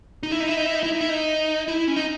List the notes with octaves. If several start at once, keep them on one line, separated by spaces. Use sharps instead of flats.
D#4
E4
D#4
E4
D#4
E4
D#4
E4
D#4
E4
D#4
E4
C#4
D#4